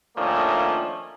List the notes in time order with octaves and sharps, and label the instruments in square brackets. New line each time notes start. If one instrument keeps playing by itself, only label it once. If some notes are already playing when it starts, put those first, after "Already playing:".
[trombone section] D#3 F3 A3 A#3 C#4 D4